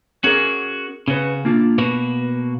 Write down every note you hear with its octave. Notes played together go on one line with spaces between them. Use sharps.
C#4 F#4 G#4 A#4
C#3 C#4 F#4 B4
A#3 D4 F4
B2 A#3 F#4 B4